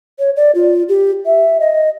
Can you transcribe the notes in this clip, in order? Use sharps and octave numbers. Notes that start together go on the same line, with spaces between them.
C#5
D5
F4
G4
E5
D#5